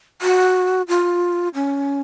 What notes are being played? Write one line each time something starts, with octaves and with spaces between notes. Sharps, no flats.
F#4
F4
C#4